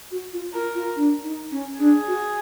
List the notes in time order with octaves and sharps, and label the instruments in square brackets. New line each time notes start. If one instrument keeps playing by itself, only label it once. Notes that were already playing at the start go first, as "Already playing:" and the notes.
[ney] F#4
F4
[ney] F4 [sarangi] A#4
[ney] F4
D4
D#4
C#4
[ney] D4 [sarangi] G#4
[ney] F#4